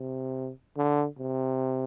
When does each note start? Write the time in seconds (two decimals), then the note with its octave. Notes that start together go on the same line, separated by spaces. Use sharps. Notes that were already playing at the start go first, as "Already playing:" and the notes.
Already playing: C3
0.77 D3
1.19 C3